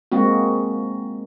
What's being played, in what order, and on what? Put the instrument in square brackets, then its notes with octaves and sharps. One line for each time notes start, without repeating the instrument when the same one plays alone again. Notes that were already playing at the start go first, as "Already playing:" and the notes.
[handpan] G#3 A#3 C4 F#4